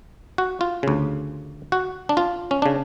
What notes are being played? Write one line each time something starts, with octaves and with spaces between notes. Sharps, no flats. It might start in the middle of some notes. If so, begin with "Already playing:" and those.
F#4
F4
D2 C#3
F#4
D4
F4
C#4
C#3 D4